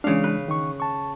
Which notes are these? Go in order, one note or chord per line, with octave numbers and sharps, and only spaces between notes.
C#3 E3 G#3 D4 F5
B4
D#3 C#6
A5 C#6